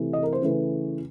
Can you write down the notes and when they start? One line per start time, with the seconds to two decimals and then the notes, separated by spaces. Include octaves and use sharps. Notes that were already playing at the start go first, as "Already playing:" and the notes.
Already playing: C3 E3 A3
0.13 D#5
0.23 A#4
0.33 C5
0.42 C#3 E3 A3 B4